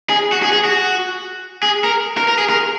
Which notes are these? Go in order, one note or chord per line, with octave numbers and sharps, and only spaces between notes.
G#4
F#4
G#4
G#4
F#4
G#4
A#4
A#4
A#4
G#4
A#4